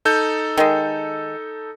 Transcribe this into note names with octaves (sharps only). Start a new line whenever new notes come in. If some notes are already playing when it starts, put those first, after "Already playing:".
D#4 A4 G6
D#3 G#3